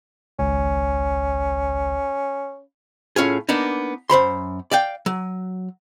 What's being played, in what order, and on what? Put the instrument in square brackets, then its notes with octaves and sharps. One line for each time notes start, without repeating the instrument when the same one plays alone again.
[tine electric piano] G#1 C#2 [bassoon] C#4
[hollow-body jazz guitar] A2 C#4 F4 G#4
A#3 B3 D4 D#4
F#2 C5 B5 C6
D5 F5 G5
F#3